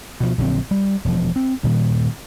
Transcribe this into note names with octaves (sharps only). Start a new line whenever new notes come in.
B2 F3
A#1 D3 F#3 C4
G3
E1 F3
C4
G2 A#2 D#3 G3